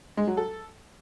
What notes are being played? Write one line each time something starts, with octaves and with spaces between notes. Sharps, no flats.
G#3
F#3
A4